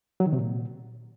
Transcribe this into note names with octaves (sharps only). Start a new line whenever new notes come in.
F#3
D#3
C3
A#2